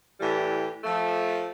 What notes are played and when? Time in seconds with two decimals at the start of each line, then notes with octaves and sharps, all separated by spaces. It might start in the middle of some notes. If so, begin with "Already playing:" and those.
0.20 A2 E3 G3 G4
0.84 F3 A3